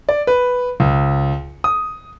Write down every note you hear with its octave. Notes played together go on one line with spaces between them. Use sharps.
D5
B4
C#2
D#6